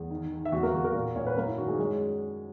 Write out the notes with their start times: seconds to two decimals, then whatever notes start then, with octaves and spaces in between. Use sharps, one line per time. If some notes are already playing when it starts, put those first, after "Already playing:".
Already playing: E2 G#4
0.10 D#3
0.32 D#3
0.45 E5
0.52 E2 F#4 F#5
0.63 A#3 A#4
0.74 E2 F#4
0.84 A#3 A#4
0.94 A#2
1.16 A#2 C#5
1.27 B4
1.36 F#2 A#3 A#4
1.47 E4
1.58 D#3 F#4
1.69 G#3 G#4
1.79 F#2 G#3 G#4